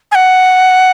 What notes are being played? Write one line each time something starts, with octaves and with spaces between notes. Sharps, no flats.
G#5
F#5